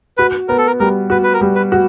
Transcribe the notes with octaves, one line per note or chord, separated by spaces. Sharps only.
F#4 B4
B3 A#4
A4
A#4
G3 A#4
F#4 B4
B4
A#4
G3
B4
F#4